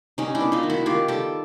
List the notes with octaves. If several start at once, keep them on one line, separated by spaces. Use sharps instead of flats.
G3 C#4 D#4
D4 E4
B3
D#4 F4
D#3
E4 F#4
D#3 F4 G4
G3 G4 A4